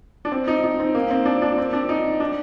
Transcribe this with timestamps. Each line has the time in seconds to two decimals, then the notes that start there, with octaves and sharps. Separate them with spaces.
0.25 D4
0.32 C4
0.48 D#4
0.64 D#4
0.80 C4
0.95 A#3
1.11 C4
1.26 D4
1.42 D4
1.58 C4
1.73 D4
1.89 D#4
2.20 D4